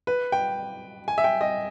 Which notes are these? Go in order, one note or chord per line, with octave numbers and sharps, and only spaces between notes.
B4
G5
G#5
E5
G5
D#5